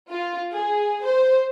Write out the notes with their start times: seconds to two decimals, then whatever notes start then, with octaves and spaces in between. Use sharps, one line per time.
0.10 F4
0.52 G#4
1.06 C5